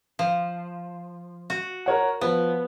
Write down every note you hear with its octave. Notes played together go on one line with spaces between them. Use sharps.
F3
F#4
A#4 C#5 F#5
F3 B3